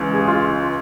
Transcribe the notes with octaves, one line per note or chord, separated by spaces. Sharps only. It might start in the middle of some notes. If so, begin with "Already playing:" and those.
Already playing: C#2 C#3 E3
G#4
F4